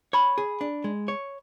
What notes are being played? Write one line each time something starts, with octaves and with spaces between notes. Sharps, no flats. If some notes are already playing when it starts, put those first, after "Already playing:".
C#5 B5
G#4
D4
G#3
C#5